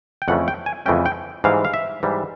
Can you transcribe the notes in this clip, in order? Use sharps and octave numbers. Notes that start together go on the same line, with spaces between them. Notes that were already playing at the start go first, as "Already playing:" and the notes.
G5
F2 C#3 E3 A3 C#4 F#5
G5
G#5
F2 C#3 E3 A3 C#4 G5
G5
G#2 E3 G3 F5
F5
E5
G#2 E3 G3